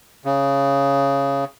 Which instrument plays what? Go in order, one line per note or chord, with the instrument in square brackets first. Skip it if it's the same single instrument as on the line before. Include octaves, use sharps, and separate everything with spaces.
[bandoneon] C#3